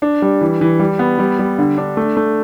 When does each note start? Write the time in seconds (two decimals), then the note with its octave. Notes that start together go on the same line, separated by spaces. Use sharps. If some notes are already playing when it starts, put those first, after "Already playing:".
0.02 D4
0.22 G3
0.41 E3
0.61 E3
0.80 G3
0.99 B3
1.19 G3
1.39 G3
1.58 D3
1.78 D4
1.97 A3
2.17 A3